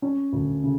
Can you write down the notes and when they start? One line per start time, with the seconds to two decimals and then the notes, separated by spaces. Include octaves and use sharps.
0.02 C#4
0.33 D2
0.63 C#3